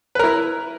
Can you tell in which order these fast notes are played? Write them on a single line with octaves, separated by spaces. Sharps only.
B4 A#4 E4